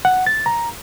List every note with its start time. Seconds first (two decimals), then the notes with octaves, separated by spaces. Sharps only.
0.05 F#5
0.26 A6
0.46 A#5